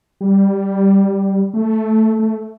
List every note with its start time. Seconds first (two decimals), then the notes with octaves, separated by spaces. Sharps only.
0.21 G3
1.54 A3
2.19 A3